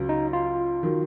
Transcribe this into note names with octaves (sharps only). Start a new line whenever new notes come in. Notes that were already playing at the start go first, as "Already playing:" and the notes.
Already playing: C#2 C#3 F#3
D#4
F4
D#3 F#3